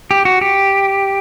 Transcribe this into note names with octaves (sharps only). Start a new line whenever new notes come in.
G4
F#4
G4